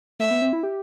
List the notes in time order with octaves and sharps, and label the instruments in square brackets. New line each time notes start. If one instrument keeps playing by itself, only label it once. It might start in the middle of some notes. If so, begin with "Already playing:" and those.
[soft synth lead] A3 [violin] E5
[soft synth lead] B3
C4
E4
G4